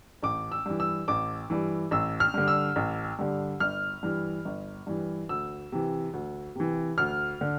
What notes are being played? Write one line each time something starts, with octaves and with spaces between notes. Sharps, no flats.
A1 D6
E6
G2 E3
E6
A1 D6
G2 E3
A1 E6
F6
G2 D3
E6
A1
G2 D3
G1 F6
G2 E3
G1
G2 E3
D2 E6
C3 E3
D2
C3 E3
D2 F6
D3